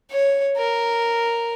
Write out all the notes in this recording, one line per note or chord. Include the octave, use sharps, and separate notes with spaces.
C#5
A#4